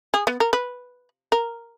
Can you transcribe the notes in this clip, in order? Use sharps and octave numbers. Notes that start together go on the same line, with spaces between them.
G#4
B3
A#4
B4
A#4